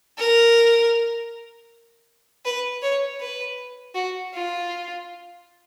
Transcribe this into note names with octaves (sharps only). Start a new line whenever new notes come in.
A#4
B4
C#5
B4
F#4
F4